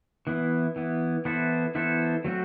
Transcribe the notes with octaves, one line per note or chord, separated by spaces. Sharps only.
E3 B3 E4
E3 B3 E4
E3 B3 E4 A4 C5
E3 B3 E4 A4 C5
F#3 A3 C4 F#4